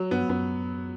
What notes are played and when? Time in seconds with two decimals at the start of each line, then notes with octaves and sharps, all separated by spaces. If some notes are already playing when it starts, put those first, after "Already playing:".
Already playing: F#3
0.11 G2 B3
0.29 F#2 B3